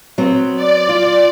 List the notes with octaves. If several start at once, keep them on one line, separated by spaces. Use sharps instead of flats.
F#3 B3 C4
D5
F4